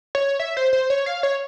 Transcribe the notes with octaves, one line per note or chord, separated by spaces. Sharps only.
C#5
E5
C5
C5
C#5
F5
C#5